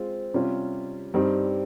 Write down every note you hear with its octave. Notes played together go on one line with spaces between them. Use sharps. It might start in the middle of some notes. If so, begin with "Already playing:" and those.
Already playing: G#3 C4 F4
C3 G3 C#4 F4
G2 G3 C4 D#4